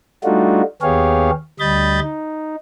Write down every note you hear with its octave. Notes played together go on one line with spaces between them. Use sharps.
G3 A3 D4 D#4 F4 F#4
D#2 B3 G4 G#4 C#5 F5
D2 G3 D#5 B5 G6 A6
D#4